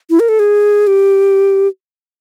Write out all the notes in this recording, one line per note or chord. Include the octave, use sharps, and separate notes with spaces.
E4
A#4
A4
G#4
G4